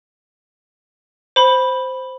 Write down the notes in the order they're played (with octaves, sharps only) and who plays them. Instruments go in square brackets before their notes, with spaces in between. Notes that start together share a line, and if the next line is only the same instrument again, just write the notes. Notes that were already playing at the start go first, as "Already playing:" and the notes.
[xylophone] C5 B5